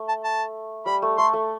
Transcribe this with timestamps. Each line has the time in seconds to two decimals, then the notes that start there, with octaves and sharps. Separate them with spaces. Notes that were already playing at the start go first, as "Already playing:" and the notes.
Already playing: A3
0.08 A5
0.24 A5
0.86 G3 B5
1.02 A3
1.18 A3 C6
1.33 A3